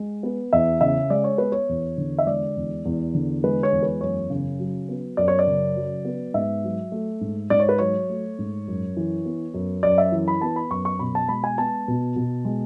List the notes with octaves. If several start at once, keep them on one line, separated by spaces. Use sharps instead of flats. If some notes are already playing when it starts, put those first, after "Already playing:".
Already playing: G#3
B3
E2 E5
C#3 E5
G#3 D5
C#5
B3 B4
C#5
E2
D3
E5
G#3 D5
E2
E2
D3
G#3 B4
C#5
E2
B4
F#2 C#5
C#3
F#3
B3
F#2 D5
C#5
D5
C#3
F#3
B3
G#2 E5
F#3
A3
G#2
G#2 D5
C#5
B4
F#3 C#5
A3
G#2
F#2
E3
B3
F#2
F#2 D5
E5
E3
B5
B3 A5
B5
F#2 C#6
C#6
B2 B5
A5
G#3 B5
G#5
B3 A5
B2
B2
G#3